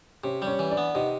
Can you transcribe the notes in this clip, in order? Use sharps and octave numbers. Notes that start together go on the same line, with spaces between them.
C3 C#4 C#5
G3
C#4 C#5
E3
D4 D5
B3
C3 D#4 D#5